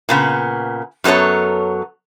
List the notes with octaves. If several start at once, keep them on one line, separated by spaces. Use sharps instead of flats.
A#2 C#3 B3
F#2 F#3 B3 A4 C#5